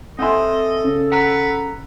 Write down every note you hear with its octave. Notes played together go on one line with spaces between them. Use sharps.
C4 A4 D#5 E5 F#5 G#5 C6
C#3
B4 F#5 A#5